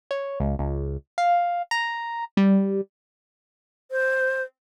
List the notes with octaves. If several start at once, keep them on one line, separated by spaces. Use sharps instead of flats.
C#5
C#2
C#2
F5
A#5
G3
C5